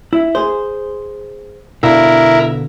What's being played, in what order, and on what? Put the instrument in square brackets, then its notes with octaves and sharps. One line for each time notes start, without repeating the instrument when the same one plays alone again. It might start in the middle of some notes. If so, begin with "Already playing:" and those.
[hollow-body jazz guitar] E4
G#4 C5
[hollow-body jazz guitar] B2 D3 F5 [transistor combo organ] E4 A#4